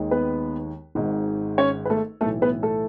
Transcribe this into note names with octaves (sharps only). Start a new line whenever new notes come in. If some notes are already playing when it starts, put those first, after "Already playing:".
Already playing: D#2 D#3 G#3
B3 B4
G#1 G#2 D#3
C#4 C#5
B4
A3 A4
B1 A2 E3 A3 A4
B3 B4
A3 A4